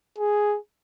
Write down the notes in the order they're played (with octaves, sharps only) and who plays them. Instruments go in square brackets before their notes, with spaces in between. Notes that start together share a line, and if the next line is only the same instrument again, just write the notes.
[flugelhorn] G#4